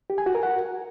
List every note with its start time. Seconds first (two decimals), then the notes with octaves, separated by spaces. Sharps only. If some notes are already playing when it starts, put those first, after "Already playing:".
0.10 G4
0.18 G#5
0.26 F#4
0.35 A#4
0.43 F#5